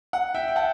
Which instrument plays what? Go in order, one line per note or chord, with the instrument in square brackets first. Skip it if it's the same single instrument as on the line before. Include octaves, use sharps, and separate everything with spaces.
[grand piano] F#5
E5 G5
G5
F#5 A5